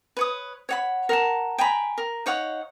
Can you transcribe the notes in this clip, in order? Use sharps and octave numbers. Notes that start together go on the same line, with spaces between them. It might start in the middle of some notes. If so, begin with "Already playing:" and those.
B4 C#5 D#6
C#5 F#5 B5
A#4 F#5 A5
G5 G#5 A#5 B5
A#4
D#4 C#5 F5 F#5